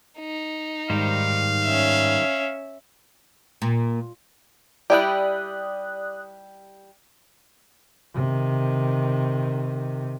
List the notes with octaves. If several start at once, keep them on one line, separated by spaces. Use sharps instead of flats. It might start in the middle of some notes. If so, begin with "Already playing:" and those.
D#4
G#2 D#3 G3 C5 F5
C#4 E5
A#2
G3 E4 G4 D5 D#6 F#6
C3 D#3